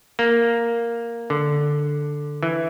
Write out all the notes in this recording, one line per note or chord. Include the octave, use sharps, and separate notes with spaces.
A#3
D3
E3